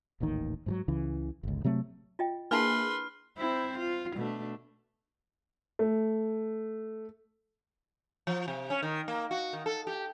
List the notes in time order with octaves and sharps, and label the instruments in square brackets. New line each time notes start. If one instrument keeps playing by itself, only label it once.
[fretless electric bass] D#1 A1 D#2 D#3
G#2 F3 F#3
C#2 C#3 E3
G1 C#2
C3 F#3 A3 C4
[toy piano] F4 D#5 G5
[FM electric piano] A#3 E4 G#4 [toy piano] D4 A5 [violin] B4 C6 [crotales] F6
[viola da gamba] C4 E4 C5
F4
B2 A3 D4
[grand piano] A3
[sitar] F3
C3
C#4
D#3
A#3
F#4
D#3
A4
G4